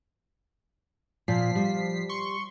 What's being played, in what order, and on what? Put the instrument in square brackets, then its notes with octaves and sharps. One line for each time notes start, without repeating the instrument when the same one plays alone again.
[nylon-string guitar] A#2 [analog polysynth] F3 B6 C7
[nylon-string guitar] G3
[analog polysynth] C6 C#6